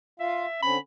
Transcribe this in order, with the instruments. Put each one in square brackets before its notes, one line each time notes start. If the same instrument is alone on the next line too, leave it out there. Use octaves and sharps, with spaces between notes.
[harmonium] F4 F5 [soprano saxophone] E5
[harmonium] D3 C4 C#4 [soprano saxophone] B5